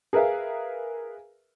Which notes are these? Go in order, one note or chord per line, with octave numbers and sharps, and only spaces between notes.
G#4 A#4 B4 E5 F5